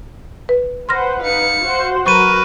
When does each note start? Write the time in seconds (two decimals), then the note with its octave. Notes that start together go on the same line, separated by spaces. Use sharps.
0.49 B4
0.89 B4 C5 F#5 C6 F6 A#6
1.22 D#4 B4 F5 C#7
1.64 F#4 C5 F#5
2.06 F#3 F#4 A#4 B4 C#6 D#7